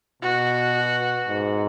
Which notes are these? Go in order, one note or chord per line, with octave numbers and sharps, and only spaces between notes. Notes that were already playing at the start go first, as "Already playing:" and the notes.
B2 F#4
G#2